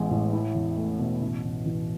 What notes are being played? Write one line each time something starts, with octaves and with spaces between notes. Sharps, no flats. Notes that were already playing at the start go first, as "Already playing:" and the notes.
Already playing: A1 G#3 B3
A2
E4
E2
A3
B2
A1
A1
E3